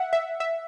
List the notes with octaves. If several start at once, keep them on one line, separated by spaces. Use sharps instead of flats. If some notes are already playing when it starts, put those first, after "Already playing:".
Already playing: E5 F#5
E5
E5